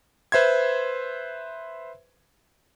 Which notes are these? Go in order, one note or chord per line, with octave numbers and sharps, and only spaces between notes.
B4 C5 E5 C6 G#6